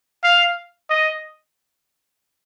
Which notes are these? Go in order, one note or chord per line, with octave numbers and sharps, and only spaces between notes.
F5
D#5